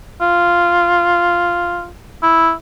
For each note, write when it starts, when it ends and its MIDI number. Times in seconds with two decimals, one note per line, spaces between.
0.21 1.88 65
2.23 2.52 64